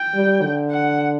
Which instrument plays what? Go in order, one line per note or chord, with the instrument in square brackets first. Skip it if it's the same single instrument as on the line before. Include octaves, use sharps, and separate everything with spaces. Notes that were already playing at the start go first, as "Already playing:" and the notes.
Already playing: [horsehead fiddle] G5
[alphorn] G3
D3
[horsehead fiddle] F#5